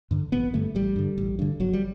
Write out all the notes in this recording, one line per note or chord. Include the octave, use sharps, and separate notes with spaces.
G2 D3
A1 B3
G2 D3 A3
A1 G3
G2 D3
A1
G2 D3
G1 F#3
G3